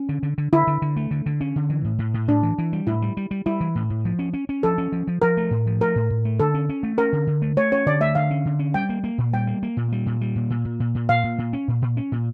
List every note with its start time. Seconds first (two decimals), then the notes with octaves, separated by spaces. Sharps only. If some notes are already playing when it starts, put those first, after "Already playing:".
Already playing: C#4
0.09 D3
0.23 D3
0.38 D3
0.53 D3 E4
0.67 D3
0.82 D3
0.96 A3
1.11 D3
1.26 D3
1.41 C#4
1.56 D3
1.70 E3
1.85 A2
1.99 A2
2.14 A2
2.28 A2 D4
2.43 E3
2.58 E3
2.73 G3
2.87 A2 E4
3.02 G3
3.17 G3
3.31 G3
3.46 G3 E4
3.61 E3
3.75 A2
3.90 A2
4.05 F3
4.19 C#4
4.33 C#4
4.49 C#4
4.63 F3 A4
4.78 C#4
4.92 F3
5.07 F3
5.22 F3 A#4
5.37 A3
5.51 A2
5.67 F3
5.81 A3 A#4
5.96 A2
6.10 A2
6.25 A3
6.40 D3 A4
6.54 C#4
6.69 C#4
6.83 A3
6.98 C#4 A#4
7.13 D3
7.27 D3
7.42 A3
7.57 A3 C#5
7.72 C#4 C#5
7.86 D3 D5
8.01 A3 E5
8.15 D3 F5
8.31 C#4
8.45 D3
8.59 C#4
8.74 G3 G5
8.89 A#3
9.04 A#3
9.18 A#2
9.33 G3 G5
9.47 A#3
9.63 A#3
9.77 A#2
9.92 G3
10.06 A#2
10.21 G3
10.36 A#2
10.50 A#2
10.65 A#2
10.80 A#2
10.95 A#2
11.09 A#2 F5
11.24 A#2
11.38 A#2
11.53 C#4
11.68 A#2
11.82 A#2
11.97 C#4
12.12 A#2